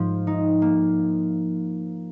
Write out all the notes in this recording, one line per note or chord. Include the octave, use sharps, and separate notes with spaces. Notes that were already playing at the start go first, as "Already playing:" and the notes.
Already playing: G#2 F3
D#4
A#3